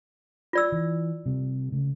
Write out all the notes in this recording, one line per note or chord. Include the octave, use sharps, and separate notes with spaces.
F4 D5 E6
E3
C3 G3
C#3 A3